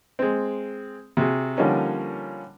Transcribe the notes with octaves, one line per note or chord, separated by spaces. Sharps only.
G#3 C4
C3 F#4 G#4
D3 F3 G3 A#3 C#4 D#4